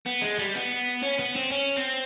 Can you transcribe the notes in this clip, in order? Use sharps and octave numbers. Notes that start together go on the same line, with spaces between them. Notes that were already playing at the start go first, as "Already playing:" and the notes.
B3
G#3
G3
B3
C#4
B3
C4
C#4
C4